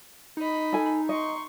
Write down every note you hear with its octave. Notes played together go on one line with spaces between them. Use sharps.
D#4 D#5 B5
A4 G#5
D#5 C6 C#6